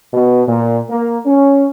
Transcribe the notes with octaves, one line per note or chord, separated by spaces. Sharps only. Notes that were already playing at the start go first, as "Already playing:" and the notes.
B2
A#2
A#3
C#4